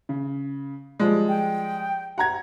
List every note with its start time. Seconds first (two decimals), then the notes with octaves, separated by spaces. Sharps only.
0.09 C#3
1.00 F3 G3 G#3
1.29 G5
2.18 F#5 A#5 G#6